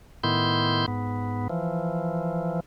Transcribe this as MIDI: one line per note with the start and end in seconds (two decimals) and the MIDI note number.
0.23 0.86 45
0.23 0.86 51
0.23 0.86 59
0.23 0.86 64
0.23 0.86 84
0.23 0.86 91
0.88 1.48 44
0.88 1.48 59
1.49 2.60 52
1.49 2.60 53